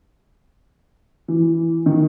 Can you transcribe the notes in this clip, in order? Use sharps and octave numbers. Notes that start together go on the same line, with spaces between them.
E3
D#3